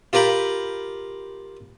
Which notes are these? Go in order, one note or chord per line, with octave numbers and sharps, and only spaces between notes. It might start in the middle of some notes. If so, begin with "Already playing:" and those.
F4 G4 A#4 G5 B5